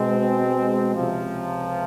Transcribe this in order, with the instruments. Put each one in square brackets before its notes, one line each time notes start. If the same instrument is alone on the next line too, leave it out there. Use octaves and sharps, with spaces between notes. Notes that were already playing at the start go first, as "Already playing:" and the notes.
Already playing: [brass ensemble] B2 G#3 C4
C#2 C3 F3